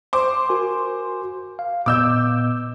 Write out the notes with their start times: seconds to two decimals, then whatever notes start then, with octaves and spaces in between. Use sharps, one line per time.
0.13 C5 D6
0.49 F#4 A#4 G#5
1.59 F5
1.86 A#2 B3 D#5 D6 E6 G6